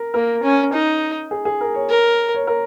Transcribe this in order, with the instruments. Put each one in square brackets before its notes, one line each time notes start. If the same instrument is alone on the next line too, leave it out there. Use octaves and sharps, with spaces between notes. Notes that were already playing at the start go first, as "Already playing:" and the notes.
Already playing: [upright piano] A#4
[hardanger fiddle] A#3 [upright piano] A#4
[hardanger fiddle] C#4
D#4
[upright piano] G#4
G#4
A#4
C#5
[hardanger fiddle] A#4
[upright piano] C#5
A#4